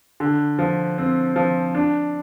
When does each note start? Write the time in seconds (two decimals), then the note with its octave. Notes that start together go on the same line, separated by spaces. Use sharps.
0.20 D3
0.59 F3
0.98 C4
1.36 F3
1.75 D4